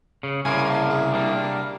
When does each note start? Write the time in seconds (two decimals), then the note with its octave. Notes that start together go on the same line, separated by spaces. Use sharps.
0.23 C#3
0.45 C2 C#3 A#3 G#5
0.70 A5
0.90 G#4
1.14 G3 A#3 D4